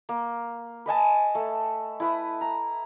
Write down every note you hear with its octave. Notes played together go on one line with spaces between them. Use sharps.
A#3
B4 D#5 G#5 A5
A3
E4 B4 D#6
A#5